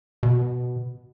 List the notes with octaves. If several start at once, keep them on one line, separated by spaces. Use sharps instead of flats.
B2